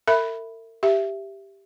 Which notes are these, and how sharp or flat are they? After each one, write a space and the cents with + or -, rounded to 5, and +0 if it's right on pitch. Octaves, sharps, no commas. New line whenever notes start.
A#4 -45 E5 +0 B5 +0
G4 +0 E5 +15